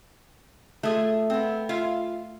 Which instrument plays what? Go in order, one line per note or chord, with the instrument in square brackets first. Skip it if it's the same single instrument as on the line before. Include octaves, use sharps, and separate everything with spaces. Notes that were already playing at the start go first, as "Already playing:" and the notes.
[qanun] A3 [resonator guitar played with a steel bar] F4 G#4 E5
[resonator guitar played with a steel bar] B3 C4
F4 E5 F5